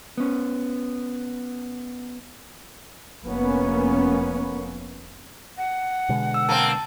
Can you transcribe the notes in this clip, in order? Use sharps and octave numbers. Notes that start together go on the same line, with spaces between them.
B3 C#4
F1 A#3 B3 C#4
F#5
B2 D3 G#3
E6
A#3 C4 A5